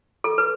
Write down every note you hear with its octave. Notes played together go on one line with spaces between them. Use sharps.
A4
B4